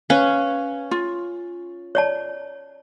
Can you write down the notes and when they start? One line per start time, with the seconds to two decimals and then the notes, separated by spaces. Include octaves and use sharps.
0.10 C#4 B4 F5
0.91 F4
1.95 C#5 D5 A5